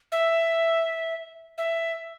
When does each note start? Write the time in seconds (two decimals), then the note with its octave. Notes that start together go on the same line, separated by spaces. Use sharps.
0.12 E5
1.58 E5